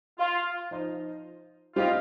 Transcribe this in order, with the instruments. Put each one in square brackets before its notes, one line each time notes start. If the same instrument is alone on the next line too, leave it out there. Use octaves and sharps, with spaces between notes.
[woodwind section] F4
[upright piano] F3 D#4 C5 D#5
[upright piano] G3 C4 G4 D#5 [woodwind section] F4